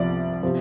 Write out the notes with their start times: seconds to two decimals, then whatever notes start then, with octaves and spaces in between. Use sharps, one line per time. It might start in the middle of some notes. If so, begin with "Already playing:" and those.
Already playing: C2 C3 F3 D5
0.43 C3 F3